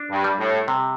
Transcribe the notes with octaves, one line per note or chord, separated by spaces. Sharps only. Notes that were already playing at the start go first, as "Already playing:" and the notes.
Already playing: D4
G2
G3
A2
C3